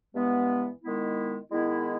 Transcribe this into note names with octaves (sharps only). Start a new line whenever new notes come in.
G2 E3 G#3 B3
D#3 G#3 B3 E4
D#3 G#3 B3 E4